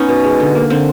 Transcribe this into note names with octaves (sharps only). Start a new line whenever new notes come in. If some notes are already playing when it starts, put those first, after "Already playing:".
Already playing: B3 C#4 D#4
B2
G#3
D3
A#3
D3 C4